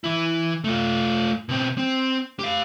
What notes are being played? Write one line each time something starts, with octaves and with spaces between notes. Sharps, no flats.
E3 E4
A3 F4
B2 C4
C4
G4 F5